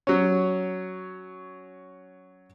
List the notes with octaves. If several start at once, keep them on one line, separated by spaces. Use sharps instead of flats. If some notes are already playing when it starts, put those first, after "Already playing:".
F#3 C#4